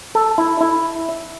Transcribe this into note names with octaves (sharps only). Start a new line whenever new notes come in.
A4
E4
E4